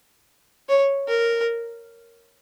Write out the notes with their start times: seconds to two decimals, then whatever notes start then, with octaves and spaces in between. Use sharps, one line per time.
0.69 C#5
1.08 A#4